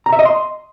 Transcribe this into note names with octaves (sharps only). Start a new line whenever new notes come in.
A#5
E5
D#5
C6